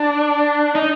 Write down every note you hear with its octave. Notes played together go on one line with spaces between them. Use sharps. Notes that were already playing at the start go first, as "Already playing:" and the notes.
Already playing: D4
D#4